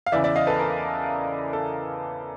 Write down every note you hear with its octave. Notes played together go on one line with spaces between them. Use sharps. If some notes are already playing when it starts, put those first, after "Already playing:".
F5
E2 C#3 E3 D5 E5
D5 E5
D#5 F5
A4 B4
A#4
A4